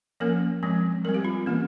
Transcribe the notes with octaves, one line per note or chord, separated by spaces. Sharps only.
F3 A#3 C#4 A#4
F3 G#3 C4
G3 C4 A#4
G4
F4
E3 A#3 C#4